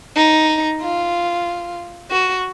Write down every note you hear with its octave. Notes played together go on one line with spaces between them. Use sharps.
D#4
F4
F#4